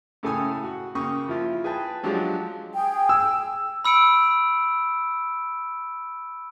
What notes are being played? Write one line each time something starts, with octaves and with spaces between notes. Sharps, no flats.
A2 C#3 A4 G5 G#5 D#6
F#4
C#3 A#3 G5 C#6 D#6
F3 E4 F4
G#4 B4 G5 A5
F3 F#3 G#3 D4 F4 G4
G#4 G5
E6
B5 E6 C#7 D7